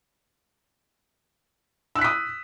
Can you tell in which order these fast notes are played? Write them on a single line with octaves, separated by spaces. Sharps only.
E6 F#6 B6 D#6